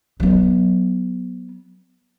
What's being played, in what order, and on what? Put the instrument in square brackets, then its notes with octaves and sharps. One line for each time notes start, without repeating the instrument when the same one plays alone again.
[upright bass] F#3 B3